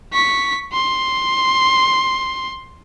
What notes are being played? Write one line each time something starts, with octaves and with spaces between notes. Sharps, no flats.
C#6 B6
C6